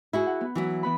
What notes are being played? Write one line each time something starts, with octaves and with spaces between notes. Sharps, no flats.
E4 F#4 G#4
F#5
B3
E3 F#3 E4
E3 B3 B5